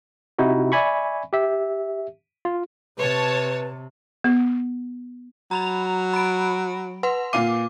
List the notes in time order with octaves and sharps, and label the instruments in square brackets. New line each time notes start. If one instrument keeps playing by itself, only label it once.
[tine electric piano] C3 D#4 E4 F#4
D5 E5 G#5 B5 C#6
G4 E5
F4
[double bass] C3 [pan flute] B4 [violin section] C#5 A5
[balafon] B3
[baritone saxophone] F#3 [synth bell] A#5 B5 F7
[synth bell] B5 D7
B4 F#5 C6
[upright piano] A#2 F5 D#7 [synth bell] D6